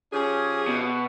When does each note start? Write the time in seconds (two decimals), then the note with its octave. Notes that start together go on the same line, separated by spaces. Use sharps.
0.13 F3 C#4 G4 G#4
0.67 B2